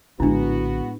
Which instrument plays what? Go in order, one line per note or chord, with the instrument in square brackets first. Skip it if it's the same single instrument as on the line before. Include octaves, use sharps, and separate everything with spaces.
[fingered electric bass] A#1 D3 [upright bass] A2 G#3 [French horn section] B3 F#4 [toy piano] D4 E4